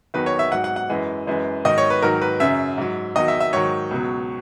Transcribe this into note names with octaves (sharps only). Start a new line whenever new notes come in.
E2 D#3 F#3 B4
C#5
E5
G#2 F#3 F#5
F#5
F#5
F#2 E3 G#3
F#2 E3 G#3
G#2 D#3 F#3 D#5
C#5
B4
G#2 D#3 F#3 A#4
B4
F#2 C#3 F#3 E5
G#2 F#3
E2 D#3 F#3 D#5
E5
E5
G#2 D#3 F#3 C#5
C#2 B2 F#3